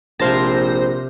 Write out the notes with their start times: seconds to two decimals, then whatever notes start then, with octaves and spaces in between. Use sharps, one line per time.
0.19 A#1 C3 C5 F5 A5 A#6